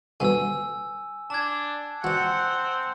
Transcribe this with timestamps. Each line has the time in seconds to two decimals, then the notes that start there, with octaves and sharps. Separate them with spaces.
0.20 G2 B2 D3 G#5 E6
1.30 D4 A5 G#6
2.04 C4 F#4 D5 F#5